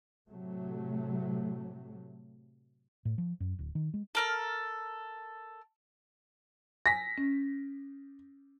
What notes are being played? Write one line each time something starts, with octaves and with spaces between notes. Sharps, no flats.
A2 C3 F#3 A3
A2
F3
F#2
D1
D#3
G#3
A4 A#4 F6
G#5 A#6 B6
C#4